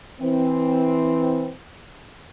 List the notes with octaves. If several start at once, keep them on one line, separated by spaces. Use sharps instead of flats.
E3 C4